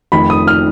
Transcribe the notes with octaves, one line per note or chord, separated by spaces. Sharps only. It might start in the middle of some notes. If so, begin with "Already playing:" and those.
F1 F2 D#3 B5
D#6
F6